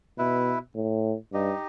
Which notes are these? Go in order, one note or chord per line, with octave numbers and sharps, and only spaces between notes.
B2 E4 B4 E5
A2
G2 D#4 G4 D#5